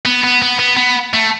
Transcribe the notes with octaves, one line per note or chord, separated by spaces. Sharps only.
B3
B3
B3
B3
B3
A3